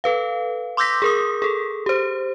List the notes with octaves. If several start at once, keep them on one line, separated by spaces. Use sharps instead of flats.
A4 B4 F5
C6 D6 E6 G6 A#6 B6
G#4 A#4 D#6
G#4 A4
G4 C5